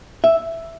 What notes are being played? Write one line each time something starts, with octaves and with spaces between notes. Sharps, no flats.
E5